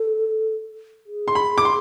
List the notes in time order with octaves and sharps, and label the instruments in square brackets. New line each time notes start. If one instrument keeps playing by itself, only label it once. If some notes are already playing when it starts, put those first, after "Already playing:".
Already playing: [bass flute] A4
G#4
[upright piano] C6
B5
D6
C6